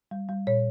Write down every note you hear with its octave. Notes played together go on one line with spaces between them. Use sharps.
G3
G3
A#2 C#5